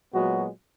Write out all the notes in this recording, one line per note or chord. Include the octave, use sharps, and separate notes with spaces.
A#2 F#3 G#3 B3 F#4